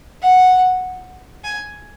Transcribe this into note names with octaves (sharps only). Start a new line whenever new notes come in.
F#5
G#5